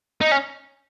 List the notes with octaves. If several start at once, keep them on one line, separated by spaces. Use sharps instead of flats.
D#4
C#4